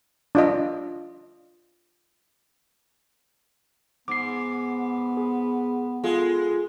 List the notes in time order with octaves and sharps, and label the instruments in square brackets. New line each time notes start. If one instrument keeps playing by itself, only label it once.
[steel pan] D4 F4 D#5
[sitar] G#2 [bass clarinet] B3 [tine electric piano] D6 C7
[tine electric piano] G#4
[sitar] G#3 [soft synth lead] F4 [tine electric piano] G#4 A4